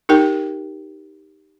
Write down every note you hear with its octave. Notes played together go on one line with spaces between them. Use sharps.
D#4 G4 A#4 G5